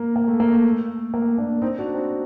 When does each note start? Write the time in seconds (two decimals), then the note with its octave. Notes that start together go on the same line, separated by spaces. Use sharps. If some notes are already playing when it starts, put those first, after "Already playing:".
Already playing: A#3
0.16 A#3
0.28 A3
0.40 A#3
0.53 A3
1.14 A#3
1.38 A#3 D4
1.62 C4 D#4
1.79 D4 F#4
1.94 C4 D#4